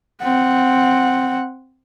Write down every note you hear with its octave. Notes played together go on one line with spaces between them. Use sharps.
C4 F#5